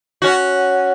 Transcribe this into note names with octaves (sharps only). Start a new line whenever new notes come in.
C#4 F#4